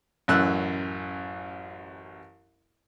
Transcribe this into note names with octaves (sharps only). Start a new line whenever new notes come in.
A1 F#2 E6 F#6